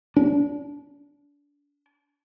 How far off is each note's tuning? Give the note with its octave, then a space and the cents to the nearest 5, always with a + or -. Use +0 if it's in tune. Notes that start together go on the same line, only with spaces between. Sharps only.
D4 -30